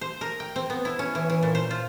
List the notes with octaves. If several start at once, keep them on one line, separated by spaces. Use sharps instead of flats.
C5
A#4
G5
C4
B3
E4
C#4
E3
E3
A#2
C5
F4